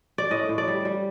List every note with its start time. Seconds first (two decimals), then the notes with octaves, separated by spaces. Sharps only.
0.18 D5
0.31 A2 D#5
0.49 A2
0.58 D5
0.68 G3
0.85 G3